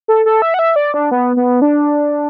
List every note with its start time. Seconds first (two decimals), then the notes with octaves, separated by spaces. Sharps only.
0.08 A4
0.26 A4
0.42 E5
0.54 F#5
0.59 E5
0.76 D5
0.94 D4
1.11 B3
1.36 B3
1.62 D4